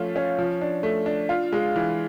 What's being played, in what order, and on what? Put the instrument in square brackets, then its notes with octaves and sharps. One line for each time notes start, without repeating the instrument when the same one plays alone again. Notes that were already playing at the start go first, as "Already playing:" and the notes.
Already playing: [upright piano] F3 A3 C#4 F4
C#4
F3
D4
A3
D4
F4
G#3
E3